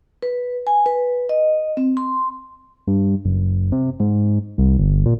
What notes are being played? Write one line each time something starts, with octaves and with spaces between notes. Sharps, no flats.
B4
G#5
B4
D#5
C4
C6
G2
F#1
C3
G#2
C2
G1
A#2